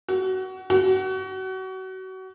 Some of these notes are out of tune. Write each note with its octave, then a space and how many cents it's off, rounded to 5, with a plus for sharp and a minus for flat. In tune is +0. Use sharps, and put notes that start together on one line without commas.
F#4 +25
F#4 +30